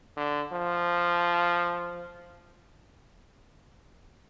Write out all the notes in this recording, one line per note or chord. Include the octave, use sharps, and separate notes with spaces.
D3
F3